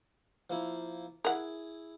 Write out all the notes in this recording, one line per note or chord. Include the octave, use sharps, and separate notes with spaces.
F3 A#3 E4
E4 G#4 A#4 F#5